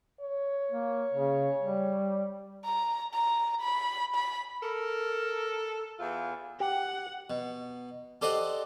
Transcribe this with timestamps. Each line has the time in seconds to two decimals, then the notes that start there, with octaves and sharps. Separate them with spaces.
0.21 C#5
0.71 A#3
1.13 C#3
1.63 G3
2.64 A#5
3.13 A#5
3.61 B5
4.15 B5
4.62 A4 A#4
5.99 E2 E4 F4
6.60 G4 F#5
7.30 B2
8.21 G4 A4 C5 D5 D#5 F#5